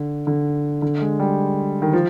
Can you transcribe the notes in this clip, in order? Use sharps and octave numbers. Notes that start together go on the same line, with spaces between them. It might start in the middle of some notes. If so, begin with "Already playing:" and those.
Already playing: D3
D3
D3
G#3
G3
D#3
F3